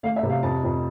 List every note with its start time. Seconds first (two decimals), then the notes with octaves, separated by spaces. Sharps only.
0.03 A3 F5
0.16 E5
0.23 C3
0.30 F5
0.42 F2 A5
0.63 F2